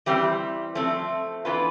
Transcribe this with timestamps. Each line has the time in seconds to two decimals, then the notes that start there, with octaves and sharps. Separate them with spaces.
0.06 E3 G3 C4 G4
0.75 F3 A3 C4
1.45 E3 B3 D4 F4 B4